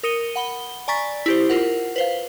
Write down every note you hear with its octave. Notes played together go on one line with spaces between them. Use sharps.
A#4 D#6 C#7 D#7 G7
F#5 B5 G7
D5 G#5 A#5 C#6 A6 B6
E4 G4 C5
F4 A#4 F#5
B4 C5 F5